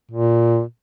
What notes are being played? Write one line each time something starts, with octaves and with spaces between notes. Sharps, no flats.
A#2